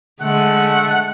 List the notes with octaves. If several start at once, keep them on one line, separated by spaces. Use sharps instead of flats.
D3 G#3 A3 F#5